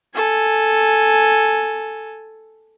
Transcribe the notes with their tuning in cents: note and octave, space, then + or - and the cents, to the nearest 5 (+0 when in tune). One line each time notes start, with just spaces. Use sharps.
A4 +0 G#5 +0